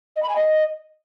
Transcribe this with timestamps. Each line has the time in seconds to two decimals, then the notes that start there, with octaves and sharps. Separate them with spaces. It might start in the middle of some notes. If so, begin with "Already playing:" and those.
0.16 D#5
0.23 B5
0.29 G#5
0.36 D#5